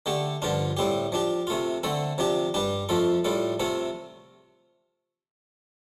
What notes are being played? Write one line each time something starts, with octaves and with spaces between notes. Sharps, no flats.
D3 A3 D4 G4
G2 D3 F3 D4 F4
A2 G3 C4 G4
F3 D4 G4
C3 A3 F4
D3 A3 C4 A4
C3 F3 D4 G4
G2 G3 D4 G4
F2 F3 A3 F4 A4
A2 G3 F4 A4
C3 A3 C4 F4 A4